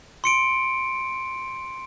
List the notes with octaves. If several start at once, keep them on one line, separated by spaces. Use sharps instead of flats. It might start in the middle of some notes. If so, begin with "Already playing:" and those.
C6 C#7 D7